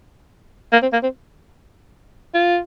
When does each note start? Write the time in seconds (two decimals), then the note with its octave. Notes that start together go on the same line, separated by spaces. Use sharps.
0.73 A#3
0.82 C4
0.93 A#3
1.03 C4
2.34 F4